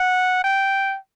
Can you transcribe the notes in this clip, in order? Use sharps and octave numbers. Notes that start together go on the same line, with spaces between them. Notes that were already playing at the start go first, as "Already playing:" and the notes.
Already playing: F#5
G5